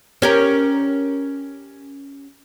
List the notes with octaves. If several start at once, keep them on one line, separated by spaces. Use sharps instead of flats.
C#4 G4 A#4